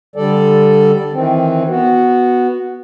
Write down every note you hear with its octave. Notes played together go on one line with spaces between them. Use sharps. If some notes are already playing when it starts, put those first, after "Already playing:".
D3 G3 A4 D5
D#3 E3 C4
B3 F#4